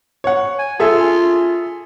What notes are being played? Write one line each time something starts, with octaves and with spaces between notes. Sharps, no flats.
C#5 F#5
G#5
F4 G#4 A4 E5